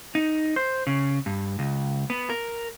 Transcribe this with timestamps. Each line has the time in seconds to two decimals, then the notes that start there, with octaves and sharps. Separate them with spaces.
0.15 D#4
0.56 C5
0.87 C#3
1.26 G2
1.59 C#2
2.10 B3
2.30 A#4